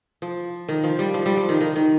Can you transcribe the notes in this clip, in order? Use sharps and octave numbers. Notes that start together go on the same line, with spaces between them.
F3
D#3
F3
G3
F3
G3
F3
D#3
D#3
D#3